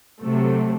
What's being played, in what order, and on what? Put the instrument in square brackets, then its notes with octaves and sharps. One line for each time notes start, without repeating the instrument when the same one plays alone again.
[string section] C3 F#3 A3